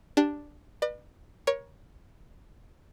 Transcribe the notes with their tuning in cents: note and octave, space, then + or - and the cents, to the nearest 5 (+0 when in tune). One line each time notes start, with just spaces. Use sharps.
D4 +0 G4 +0
B4 -20 D5 +45
A#4 +30 C#5 +0